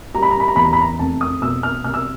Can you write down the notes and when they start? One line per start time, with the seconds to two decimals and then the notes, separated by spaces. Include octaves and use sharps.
0.14 G3 A#5
0.22 B5
0.31 A#5
0.40 B5
0.48 A#5
0.56 E2 B5
0.65 A#5
0.73 B5
0.81 A#5
0.99 F1 A5
1.21 D#6
1.41 B2 E6
1.63 F6
1.84 C2 F6
1.94 E6